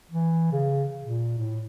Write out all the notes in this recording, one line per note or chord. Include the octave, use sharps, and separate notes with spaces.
E3
C#3
A#2
A2